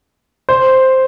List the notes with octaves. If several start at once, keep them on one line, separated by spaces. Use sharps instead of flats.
C5